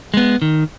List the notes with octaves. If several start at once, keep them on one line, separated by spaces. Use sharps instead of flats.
G#3 B3
D#3